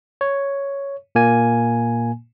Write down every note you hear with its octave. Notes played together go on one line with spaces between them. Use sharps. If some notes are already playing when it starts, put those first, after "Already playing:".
C#5
A#2 A#3 G#5